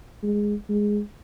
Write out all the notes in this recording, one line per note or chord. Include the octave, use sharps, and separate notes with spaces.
G#3
G#3